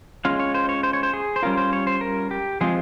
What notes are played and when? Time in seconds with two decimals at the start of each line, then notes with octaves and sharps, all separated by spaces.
0.25 G#3 C#4 F4 F5
0.40 C#5
0.54 C5
0.69 C#5
0.83 C5
0.93 C#5
1.03 C5
1.13 G#4
1.36 C5
1.43 G3 C#4 F4 A#4
1.57 C5
1.73 C#5
1.87 C5
2.01 A#4
2.31 G4
2.61 F3 G#3 C4 F4 G#4